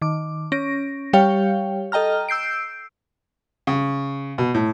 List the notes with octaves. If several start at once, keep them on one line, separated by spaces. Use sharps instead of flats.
D#3 D6
C#4 A#6 D7
G3 G4 C#5 F5 G5
A4 D#5 G5 A#5 F6
E6 G6 C7 D7
C#3
B2
A2